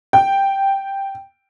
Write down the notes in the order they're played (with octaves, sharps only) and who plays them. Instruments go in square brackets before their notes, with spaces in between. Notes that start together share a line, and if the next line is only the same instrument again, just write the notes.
[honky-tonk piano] G5